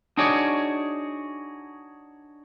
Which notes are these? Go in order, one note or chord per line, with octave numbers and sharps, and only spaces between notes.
D4 D#4 F#4 G#4 C#5 D5